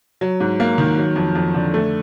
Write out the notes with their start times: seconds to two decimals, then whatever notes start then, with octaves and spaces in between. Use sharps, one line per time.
0.21 F#3
0.40 G#2
0.60 A#3
0.78 D#3
0.98 F#3
1.16 F2
1.35 F2
1.55 D3
1.74 A3